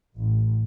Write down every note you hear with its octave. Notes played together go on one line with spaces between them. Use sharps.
A1